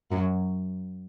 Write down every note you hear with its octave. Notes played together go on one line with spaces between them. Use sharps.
F#2 F#3